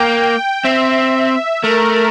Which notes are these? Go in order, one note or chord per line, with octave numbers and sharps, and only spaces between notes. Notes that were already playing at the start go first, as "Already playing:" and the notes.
Already playing: A#3 G5
C4 E5
A3 A#4